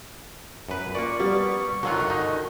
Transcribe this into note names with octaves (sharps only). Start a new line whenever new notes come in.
F#2 B4
A#2 A#3 D5 C#6
G3 B3
G1 D3 D#3 F#3 F4 F#4
D#4